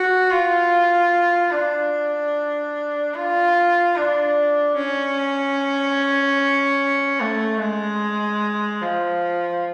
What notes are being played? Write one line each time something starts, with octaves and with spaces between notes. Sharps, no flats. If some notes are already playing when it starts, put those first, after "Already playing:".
Already playing: F#4
F4
D4
F4
D4
C#4
A3
G#3
F3